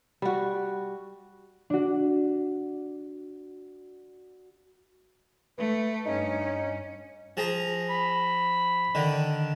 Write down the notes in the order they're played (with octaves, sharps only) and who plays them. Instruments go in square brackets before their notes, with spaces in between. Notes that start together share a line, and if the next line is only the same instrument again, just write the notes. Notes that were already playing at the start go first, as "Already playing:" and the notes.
[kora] G3 F#4
[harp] D4 F#4
[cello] A3 [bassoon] B4
[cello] G2 C#4 [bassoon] D#4
[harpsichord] F3 G#4 A#5
[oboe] B5
[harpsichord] D3 D#3